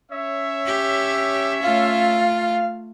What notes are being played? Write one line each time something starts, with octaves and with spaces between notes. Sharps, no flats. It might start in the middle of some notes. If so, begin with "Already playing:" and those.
C#4 C#5 E5
G4
A3 F4 F5